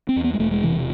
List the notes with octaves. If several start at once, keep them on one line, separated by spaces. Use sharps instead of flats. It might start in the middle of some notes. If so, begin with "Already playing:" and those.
C4
E2
B3
G#3
E1 A3
G#3
C3 E3